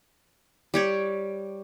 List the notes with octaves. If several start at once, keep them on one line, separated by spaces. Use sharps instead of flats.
G3 G4 C#5 D5